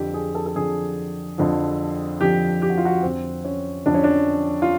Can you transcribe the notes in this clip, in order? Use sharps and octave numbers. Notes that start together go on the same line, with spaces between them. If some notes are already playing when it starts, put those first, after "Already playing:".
Already playing: F2 D3 F3 G4
G#4
A4
A4
F2 D3 F3 G#4
F2 D3 F3
F2 D3 F3 G4
G4
F#4
F4
F#4
F2 D3 F3 C4
C#4
F2 D3 F3 D4
C#4
D4
F4